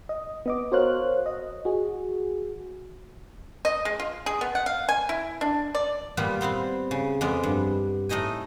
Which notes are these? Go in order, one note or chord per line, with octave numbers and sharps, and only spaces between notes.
D#5
B3 D#5 D6
F#4 A#4 C5 C#5 F5 F#6
D#5
F#4 G#4
D#5
G#3
F4
G#4
B3
F#5
F5
G#5
E4
D4
D5
A#2 G3 B3 F4
B3 C4 C5 F5
C#3
F2 G#3 B3 D5
G2
A2 A3 D#4 D#5 G#5